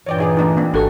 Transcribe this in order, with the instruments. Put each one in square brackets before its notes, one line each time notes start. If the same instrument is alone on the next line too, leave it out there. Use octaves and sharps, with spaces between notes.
[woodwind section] G2 A#2 E3 [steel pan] C#5 D5 G5
[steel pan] D#4 G#4 D5
A3 D4 D#4
A#3 C4 D4
[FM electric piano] G#1 A4 C#6 [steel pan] D4 F#4 G4